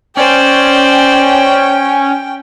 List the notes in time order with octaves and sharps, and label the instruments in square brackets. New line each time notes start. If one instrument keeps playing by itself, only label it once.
[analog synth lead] C#4 [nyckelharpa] C5 D5 [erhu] G5